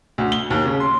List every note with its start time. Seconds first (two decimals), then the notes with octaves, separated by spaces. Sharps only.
0.18 D2
0.32 G7
0.50 D#2
0.65 C#3
0.80 C6